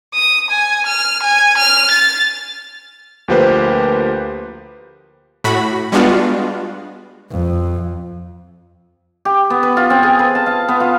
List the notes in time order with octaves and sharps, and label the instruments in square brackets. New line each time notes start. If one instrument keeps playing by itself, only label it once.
[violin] D#6
G#5
F6
G#5
F6
A6
[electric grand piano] D2 F3 A#3 G4 B4 C5
[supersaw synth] A2 F#4 B5
G3 G#3 B3 D4 F4 F#4
[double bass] F2
[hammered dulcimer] G4
B3
B4
F4
C4
G#4
B4
A5
F5
B3
F4